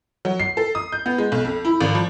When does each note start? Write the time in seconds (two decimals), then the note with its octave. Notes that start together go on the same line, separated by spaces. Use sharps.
0.25 F#3
0.40 C7
0.57 A4
0.75 D#6
0.92 G6
1.06 B3
1.18 G#3
1.32 B1
1.45 F2
1.65 E4
1.81 G#1
1.95 F3